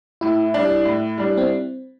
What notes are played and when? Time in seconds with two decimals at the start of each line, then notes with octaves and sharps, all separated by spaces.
0.21 A2 E4
0.54 G3 D4
0.85 A2
1.18 G3 D4
1.37 C4